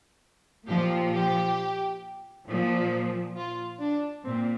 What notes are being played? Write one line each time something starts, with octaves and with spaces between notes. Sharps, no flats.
A#2 F3 G4
G4
A#2 F3
F4
D4
A#2 C4